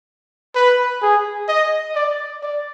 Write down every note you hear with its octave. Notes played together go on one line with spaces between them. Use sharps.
B4
G#4
D#5
D5
D5